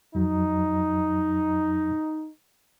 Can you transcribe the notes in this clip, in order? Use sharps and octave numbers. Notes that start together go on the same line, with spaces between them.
F2 F#3 D#4